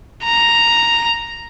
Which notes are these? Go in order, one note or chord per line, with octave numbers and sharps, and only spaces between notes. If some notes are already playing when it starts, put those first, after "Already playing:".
A#5